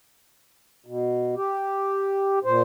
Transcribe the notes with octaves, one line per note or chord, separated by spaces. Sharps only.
B2
G4
A#2 C5